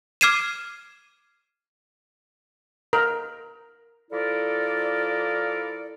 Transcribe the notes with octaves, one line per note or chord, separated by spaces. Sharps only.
D6 F6 G#6 C7 D#7 E7
A#4
F3 E4 A4 A#4 D5